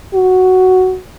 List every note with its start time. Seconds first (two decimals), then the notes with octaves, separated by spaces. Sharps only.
0.15 F#4